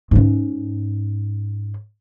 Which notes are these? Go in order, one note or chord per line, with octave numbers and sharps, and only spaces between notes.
G#2 C#4